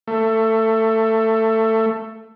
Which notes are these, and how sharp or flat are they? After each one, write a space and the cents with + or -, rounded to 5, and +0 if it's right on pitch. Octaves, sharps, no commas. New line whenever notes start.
A3 +20